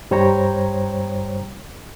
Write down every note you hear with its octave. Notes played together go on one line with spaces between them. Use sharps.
G2 G3 C5 C#5 G5 A#5